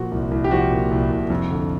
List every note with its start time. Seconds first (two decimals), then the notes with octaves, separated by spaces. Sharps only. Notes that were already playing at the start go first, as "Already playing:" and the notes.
Already playing: A#2 F3 F#4
0.11 C2
0.31 C2
0.44 G4
0.51 F3 F#4
0.70 A#2
0.91 C2
1.10 C2
1.30 F2
1.50 D3